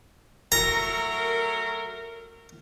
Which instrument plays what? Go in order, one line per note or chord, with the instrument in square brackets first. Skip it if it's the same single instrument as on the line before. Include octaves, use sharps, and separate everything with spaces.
[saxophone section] F#3 A3 A#4 [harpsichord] A#5